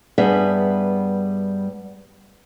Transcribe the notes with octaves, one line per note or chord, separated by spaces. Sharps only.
G2 G3 B3 G#4 B4 E5